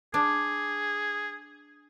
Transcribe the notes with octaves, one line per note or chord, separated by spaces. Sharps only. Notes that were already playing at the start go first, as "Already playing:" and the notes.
D4 G#4